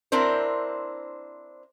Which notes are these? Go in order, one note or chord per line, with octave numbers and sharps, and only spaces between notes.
C4 D4 E4 A#4 C5